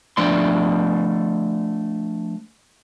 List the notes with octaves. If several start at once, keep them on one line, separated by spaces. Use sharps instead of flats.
F3 A3 D4 D5 C6